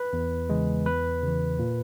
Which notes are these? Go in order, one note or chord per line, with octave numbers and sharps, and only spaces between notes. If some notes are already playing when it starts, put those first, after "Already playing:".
Already playing: B4
E2
C#3 E3 G#3
E2 B4
C#3 E3
A#2